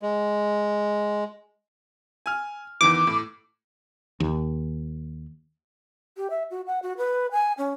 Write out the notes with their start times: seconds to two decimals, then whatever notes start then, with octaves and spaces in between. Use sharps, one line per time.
0.02 G#3
2.26 G#5 F6
2.81 E2 D#3 E3 D6
3.07 A2
4.20 D#2
6.17 G4
6.30 E5
6.50 F#4
6.67 F#5
6.82 F#4
6.98 B4
7.32 G#5
7.58 C#4